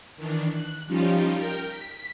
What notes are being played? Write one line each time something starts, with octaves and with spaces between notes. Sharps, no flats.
D#3 E3 D4
F#6
F3 G3 C#4 D#4 F4 G4
A#4 G5
B6